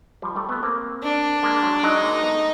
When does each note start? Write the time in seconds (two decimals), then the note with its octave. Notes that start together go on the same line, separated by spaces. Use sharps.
0.22 F3 G3
0.36 G3 A3
0.49 A3 B3
0.63 A#3 C4
1.03 D4
1.43 G#3 A#3
1.63 F#3 G#3
1.83 F#3 G#3 D#4
2.03 G#3 A#3
2.23 A3 B3